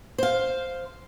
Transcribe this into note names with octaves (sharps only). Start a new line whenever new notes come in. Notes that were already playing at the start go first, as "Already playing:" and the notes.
C5 F5